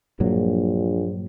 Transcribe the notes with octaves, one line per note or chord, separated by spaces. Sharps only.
A#1 G2 A#2 F#3